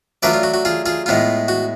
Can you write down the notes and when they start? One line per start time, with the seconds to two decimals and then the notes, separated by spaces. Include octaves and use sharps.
0.23 F#3 A3 D4 F4 B4 D5
0.33 F4
0.43 F#4
0.54 F#4
0.65 F4 G#4
0.86 F4 G#4
1.06 A2 G#3 B3 F4
1.48 F#4